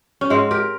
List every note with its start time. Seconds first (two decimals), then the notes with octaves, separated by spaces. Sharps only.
0.21 C#4
0.30 G#2 G#3 C4
0.51 G4 A#4